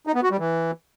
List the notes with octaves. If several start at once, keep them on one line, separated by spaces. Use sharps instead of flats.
D#4
B3
F#4
G3
E3